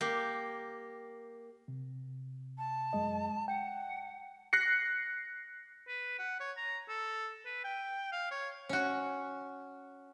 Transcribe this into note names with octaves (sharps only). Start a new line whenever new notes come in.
A#3 G4
C3
A5
F#2 G#3 D#5
F#5 G5
F#6 A#6 C7 C#7
B4
F#5
C#5
A#5
A4
B4
G5
F5
C#5
C#4 F#4